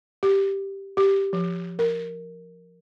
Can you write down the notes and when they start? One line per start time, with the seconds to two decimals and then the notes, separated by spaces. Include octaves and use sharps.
0.23 G4
0.97 G4
1.33 F3
1.79 A#4